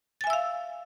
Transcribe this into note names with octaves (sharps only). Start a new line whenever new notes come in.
E5 F5 G#5 E6 A6